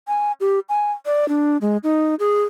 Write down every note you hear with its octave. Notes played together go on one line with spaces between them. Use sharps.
G#5
G4
G#5
D5
D4
G#3
D#4
G#4